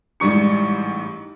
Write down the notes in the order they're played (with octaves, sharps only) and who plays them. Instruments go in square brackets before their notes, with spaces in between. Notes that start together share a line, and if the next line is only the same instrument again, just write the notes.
[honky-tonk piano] A1 G#2 G3 C#6 C#7